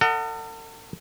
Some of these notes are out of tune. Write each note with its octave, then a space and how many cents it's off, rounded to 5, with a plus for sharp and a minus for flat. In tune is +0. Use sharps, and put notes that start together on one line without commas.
A4 +40 D#5 +0 F#5 +0